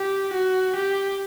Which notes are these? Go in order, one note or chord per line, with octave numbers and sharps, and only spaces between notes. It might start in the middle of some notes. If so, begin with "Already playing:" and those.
Already playing: G4
F#4
G4